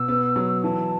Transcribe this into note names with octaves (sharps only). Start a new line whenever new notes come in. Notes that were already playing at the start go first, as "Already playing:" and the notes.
Already playing: B2 E6
B3
F#3
E3 A5